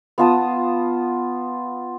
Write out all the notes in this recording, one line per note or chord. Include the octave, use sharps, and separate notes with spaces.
B3 F4 A5 D#6